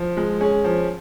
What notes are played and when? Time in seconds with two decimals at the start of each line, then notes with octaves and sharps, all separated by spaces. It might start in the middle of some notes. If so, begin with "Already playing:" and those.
Already playing: F3
0.17 G#3
0.41 C#4 G#4
0.64 F3